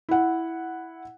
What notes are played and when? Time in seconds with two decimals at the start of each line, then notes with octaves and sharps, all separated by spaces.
0.09 E4 F#5